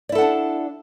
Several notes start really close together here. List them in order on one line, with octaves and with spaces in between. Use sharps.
D5 E4 A4 F#5 D4